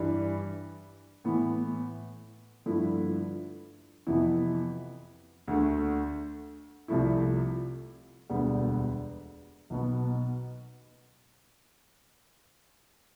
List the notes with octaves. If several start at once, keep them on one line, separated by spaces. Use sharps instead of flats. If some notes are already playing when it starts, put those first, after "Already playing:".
Already playing: G2 E3 G3
A2 E3 B3
G2 D3 F3 A3 E4
F2 C3 E3 B3 E4
D2 D3 A3
C2 C3 F3 A3 E4
E1 D2 D3 G3 B3
B1 B2 B3